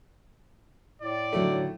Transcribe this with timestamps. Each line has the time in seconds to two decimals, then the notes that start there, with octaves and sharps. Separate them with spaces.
1.02 A2 D5
1.33 D3 F#3 A3 D#4